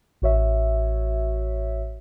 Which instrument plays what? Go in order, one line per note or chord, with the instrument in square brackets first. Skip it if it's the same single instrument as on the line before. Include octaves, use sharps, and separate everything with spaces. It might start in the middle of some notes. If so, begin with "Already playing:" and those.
[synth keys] A1 F#4 C#5 E5